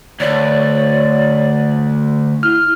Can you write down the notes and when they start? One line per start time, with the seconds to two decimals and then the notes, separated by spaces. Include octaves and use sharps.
0.20 D2 C#5 D5
2.43 E4 F6